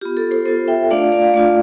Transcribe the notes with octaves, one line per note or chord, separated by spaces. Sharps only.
B3 F4 G4
A4
A4 C5
B3 F4 A4 C5
E5 G5
A3 D4 F4 D5 F5
D5 F5
A3 D4 F4